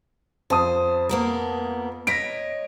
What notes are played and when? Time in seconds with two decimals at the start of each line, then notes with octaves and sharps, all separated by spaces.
0.50 F2 C5 A5 D#6
1.09 A#3 B3 A#4
2.07 C#5 D#5 A#6 B6 D7